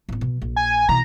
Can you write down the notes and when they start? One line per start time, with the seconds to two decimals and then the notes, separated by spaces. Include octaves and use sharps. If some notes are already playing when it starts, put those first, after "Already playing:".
0.09 A1 B3
0.21 B2
0.42 A#1
0.56 G#5
0.89 B2 E3 A#5